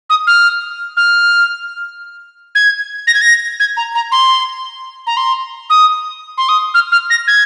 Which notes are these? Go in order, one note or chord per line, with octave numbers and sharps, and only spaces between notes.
D#6
F6
F6
G#6
A#6
G#6
A#6
G#6
A#5
A#5
C6
A#5
C6
D#6
C6
D#6
F6
F6
A#6
G#6